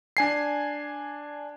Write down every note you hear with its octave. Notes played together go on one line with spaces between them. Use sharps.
D4 G#5 C7